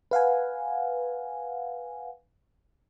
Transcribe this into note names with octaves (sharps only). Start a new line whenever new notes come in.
B4 F5 F#5 G#5